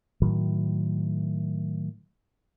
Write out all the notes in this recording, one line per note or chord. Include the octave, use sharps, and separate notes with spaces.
A2 D#3 F#3